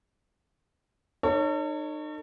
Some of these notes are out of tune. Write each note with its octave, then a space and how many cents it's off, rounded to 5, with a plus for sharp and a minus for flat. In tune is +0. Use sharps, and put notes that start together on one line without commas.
D#4 -35 A4 +45 C#5 +0